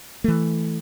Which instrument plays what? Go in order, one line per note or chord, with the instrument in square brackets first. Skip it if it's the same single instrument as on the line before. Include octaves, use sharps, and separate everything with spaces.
[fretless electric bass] E3 A3